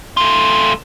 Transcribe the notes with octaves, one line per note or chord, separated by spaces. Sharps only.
A3 F4